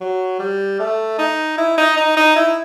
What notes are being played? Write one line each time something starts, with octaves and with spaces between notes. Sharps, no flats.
F#3
G3
A3
D#4
E4
D#4
D#4
D#4
E4